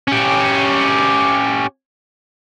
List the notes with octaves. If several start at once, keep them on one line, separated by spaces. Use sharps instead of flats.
C#4 G4